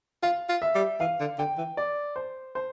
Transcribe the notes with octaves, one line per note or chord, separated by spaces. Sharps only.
F4 F5
F4
E5
G3
E3 F5
D3
D3 G5
E3
D5
C5
C5